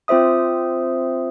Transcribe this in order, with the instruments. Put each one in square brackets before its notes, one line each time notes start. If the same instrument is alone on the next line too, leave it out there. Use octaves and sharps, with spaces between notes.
[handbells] C4 F4 C5 E5 D#6